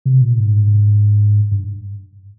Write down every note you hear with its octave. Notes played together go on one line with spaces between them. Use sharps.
C3
A#2
G#2
G2